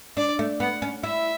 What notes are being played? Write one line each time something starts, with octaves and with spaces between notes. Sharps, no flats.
D4 D5
A3
B3 F#5
C#4
E4 E5